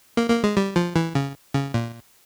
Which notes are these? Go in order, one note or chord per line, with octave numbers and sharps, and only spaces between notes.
A#3
A#3
G#3
G3
F3
E3
C#3
C#3
A#2